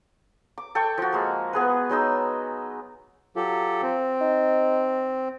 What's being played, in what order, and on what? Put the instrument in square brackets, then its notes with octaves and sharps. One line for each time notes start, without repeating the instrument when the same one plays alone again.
[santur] D6
A4 G5 C#6
F3 F#4
G#3 A#3
B3 G#4 B4
F#3 G#3 D#4 E6
[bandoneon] F#3 G4 A4 [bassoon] F4
[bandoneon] C4
[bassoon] D#4